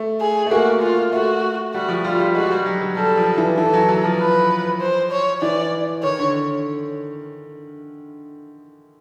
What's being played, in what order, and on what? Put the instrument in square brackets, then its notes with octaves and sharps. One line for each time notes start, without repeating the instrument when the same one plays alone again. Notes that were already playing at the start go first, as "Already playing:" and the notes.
Already playing: [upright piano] A3
[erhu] G#4
[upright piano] A3
[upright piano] A#3 [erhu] F#4
[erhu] F4
[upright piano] A3 [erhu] F#4
[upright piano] G3 [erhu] F#4
[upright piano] F3
[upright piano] G3 [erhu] F4
[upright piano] G3
[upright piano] G#3 [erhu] F#4
[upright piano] G3
F#3
F#3
[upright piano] G3 [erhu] A4
[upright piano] F3
E3
[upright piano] E3 [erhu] A4
[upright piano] F#3
F#3
F3
[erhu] B4
C5
C#5
[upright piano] E3 [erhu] D5
[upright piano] D#3 [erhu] C#5
[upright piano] D3